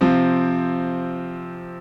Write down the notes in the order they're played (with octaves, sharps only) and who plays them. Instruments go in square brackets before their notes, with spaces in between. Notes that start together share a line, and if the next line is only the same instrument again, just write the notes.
[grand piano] C3 F3 C4